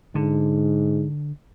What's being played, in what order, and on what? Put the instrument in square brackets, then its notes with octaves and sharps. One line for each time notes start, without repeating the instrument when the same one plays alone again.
[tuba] G#2 [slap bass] D3